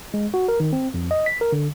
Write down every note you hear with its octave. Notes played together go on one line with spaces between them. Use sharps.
G#3
F#4
A#4
D#3
C4
F2
D#5
B6
A#4
D3